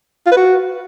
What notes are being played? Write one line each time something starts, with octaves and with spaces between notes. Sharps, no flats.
F4
B4
F#4